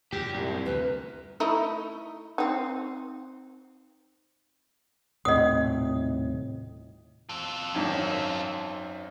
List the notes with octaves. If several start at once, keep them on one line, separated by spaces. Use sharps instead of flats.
F#2 A#2 G4
C2
D2 B4
A3 D#4 E4
C4 D#4
D#1 A2 C3 D#5 D#6
F4 A4
G#1 F#2 D#3